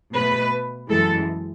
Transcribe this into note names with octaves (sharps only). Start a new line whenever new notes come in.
B2 A3 B4
F#2 E3 G#3 A4